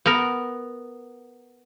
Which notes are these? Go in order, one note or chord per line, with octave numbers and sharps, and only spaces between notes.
B3 A#4